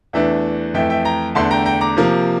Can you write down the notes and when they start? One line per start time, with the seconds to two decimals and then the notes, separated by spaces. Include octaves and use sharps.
0.13 E2 E3 A3 D4 E5
0.74 F2 E3 A3 E5 G5
0.90 E5 G5
1.05 G5 A#5
1.35 E2 D3 A3 D4 A5 C6
1.51 G5 A#5
1.66 G5 A#5
1.81 A#5 D6
1.97 C3 F3 A#3